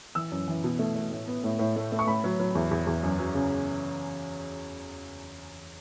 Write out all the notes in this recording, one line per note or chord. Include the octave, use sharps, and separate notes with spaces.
E3 E6
F#2
E3
B2
A3
A3
A2
B3
A2
A2
A3
A3
C#6
A2 B5
F#3
F#3
E2
E2
E2
F#2
F#3
C#3